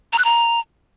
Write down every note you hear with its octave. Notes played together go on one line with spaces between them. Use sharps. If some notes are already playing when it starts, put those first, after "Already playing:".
A#5
F#6
A#5